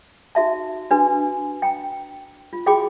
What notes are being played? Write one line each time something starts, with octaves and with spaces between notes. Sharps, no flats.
D#4 F#4 E5 A5
D4 F#4 B4 G#5
G5 A#5
F4
F#4 G#4 G5 B5 D6